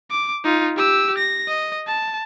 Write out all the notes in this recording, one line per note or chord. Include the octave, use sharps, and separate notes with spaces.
D6
D#4 F4
G4 E6
A#6
D#5
A5